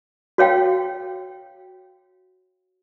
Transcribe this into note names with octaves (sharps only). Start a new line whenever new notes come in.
F#4 C#5 F5 G5